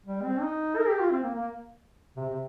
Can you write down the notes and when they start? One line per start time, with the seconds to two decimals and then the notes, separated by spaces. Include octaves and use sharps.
0.06 G3
0.23 C4
0.41 D#4
0.76 A#4
0.88 G4
1.00 F4
1.11 C4
1.23 A#3
1.35 A#3
2.17 C3
2.29 C3